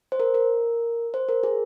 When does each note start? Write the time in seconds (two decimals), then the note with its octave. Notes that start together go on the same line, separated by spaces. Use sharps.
0.12 C5
0.20 A#4
0.34 A#4
1.14 C5
1.29 A#4
1.43 G#4